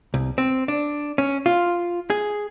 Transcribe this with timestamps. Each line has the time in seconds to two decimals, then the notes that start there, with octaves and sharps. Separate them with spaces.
0.14 C2
0.38 C4
0.68 D4
1.18 C#4
1.46 F4
2.10 G#4